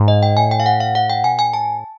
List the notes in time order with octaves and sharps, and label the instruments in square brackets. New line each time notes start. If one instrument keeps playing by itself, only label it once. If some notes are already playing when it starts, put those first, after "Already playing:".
Already playing: [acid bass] G#2
[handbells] D#5
G5
[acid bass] A2 [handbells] G#5
[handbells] G5
F5
F#5
F5
F#5
G5
[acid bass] B2 [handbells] G#5
[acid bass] A#2 [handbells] G#5
[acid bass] A2 [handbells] A5